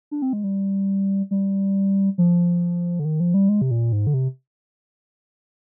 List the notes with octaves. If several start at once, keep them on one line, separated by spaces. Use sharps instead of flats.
D4
C4
G#3
G3
G3
F3
D3
D#3
F3
G3
G#3
C3
A#2
G#2
D3
C3